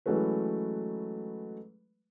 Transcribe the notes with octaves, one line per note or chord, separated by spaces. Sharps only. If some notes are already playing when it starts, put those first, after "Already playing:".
E3 F#3 G#3 A3 C#4 B4